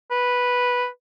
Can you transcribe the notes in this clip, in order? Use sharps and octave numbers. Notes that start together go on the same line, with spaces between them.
B4